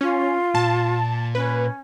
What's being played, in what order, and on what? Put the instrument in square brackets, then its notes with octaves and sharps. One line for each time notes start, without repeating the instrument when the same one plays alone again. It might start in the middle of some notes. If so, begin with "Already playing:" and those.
[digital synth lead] C#4 [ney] F4
[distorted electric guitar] A#2 [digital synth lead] A5
[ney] C#4 [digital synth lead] B4